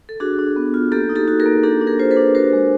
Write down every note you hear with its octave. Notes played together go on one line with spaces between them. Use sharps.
A4
D4 F#4 G#4
D4
B3
F4
A#3 G4 A4
D#4
G4 A4
F#4
G#4 A#4
A#3
D4 G4 A4
D4
G#4 A#4
F4 C5
A4 B4
D4
F#4 A#4 C5
G#3